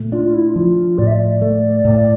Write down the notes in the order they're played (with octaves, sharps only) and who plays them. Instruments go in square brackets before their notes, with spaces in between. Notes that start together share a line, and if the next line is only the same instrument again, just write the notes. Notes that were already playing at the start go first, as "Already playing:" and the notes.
Already playing: [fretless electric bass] A#2 A3
[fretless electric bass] D4 [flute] F4
[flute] F4
E4
[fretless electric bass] F3 [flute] F4
[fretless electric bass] A2 [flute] D5
[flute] E5
D5
[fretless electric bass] A3
A2